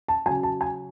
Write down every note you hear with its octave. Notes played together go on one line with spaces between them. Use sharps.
A5
C#3 F#3 G#5
A5
G#5